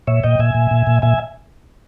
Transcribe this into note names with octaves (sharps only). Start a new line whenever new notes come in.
A#2 C#5 E5
A#2 D#5 G5
A#2 E5 G#5
A#2
A#2
A#2
A#2 E5 G#5